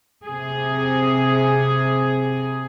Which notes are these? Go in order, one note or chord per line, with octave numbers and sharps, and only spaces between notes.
C3 G#4